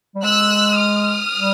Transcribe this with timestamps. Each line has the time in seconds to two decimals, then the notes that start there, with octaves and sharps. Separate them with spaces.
0.15 G3
0.23 G#3 E6 F#6
0.79 D#6 F6
1.35 G3